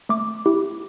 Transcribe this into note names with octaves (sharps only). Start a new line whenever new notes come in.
A3 D6
E4 G4